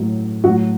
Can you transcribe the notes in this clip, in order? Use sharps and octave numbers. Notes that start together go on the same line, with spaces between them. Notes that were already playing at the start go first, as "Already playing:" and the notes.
Already playing: A2 F#3
A2 F#3 F#4